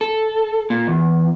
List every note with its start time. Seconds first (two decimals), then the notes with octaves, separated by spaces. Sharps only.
0.01 A4
0.70 A#2
0.87 E2